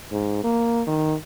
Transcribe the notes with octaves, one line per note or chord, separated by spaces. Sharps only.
G#2
A#3
D#3